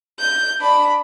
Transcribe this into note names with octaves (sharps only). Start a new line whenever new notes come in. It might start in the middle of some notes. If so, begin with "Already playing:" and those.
G6
D4 B5